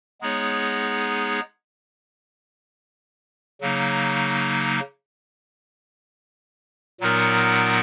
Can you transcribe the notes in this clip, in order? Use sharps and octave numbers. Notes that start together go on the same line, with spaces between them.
G#3 B3 D#4 G#4 C#5
C#3 F#3 A#3 D#4
A#2 F#3 B3 D#4 A#4